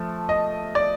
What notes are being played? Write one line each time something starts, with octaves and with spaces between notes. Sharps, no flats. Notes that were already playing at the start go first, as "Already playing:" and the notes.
Already playing: F3 A3
D#5
D5